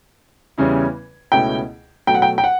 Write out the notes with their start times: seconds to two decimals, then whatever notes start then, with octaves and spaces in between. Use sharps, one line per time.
0.58 E2 C#3 G3 C#4 E4
1.32 C#2 B2 A3 C#4 E4 G5
2.07 B2 F#3 A3 G5
2.15 F#5
2.22 G5
2.38 G5
2.44 F#5